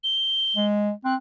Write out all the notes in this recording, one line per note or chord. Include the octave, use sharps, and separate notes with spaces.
G7
G#3
C4 F#6